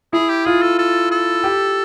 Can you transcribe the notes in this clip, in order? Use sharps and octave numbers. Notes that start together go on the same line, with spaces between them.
E4 G#4
G4
F4 G#4
A4
A4
A4
G4